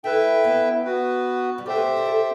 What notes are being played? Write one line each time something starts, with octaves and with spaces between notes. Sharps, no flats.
A3 E4 B4 E5 G5
B3
B3 F#4 B4
G3
A3 G4 C5 E5 G5
B3
C4
D4
A4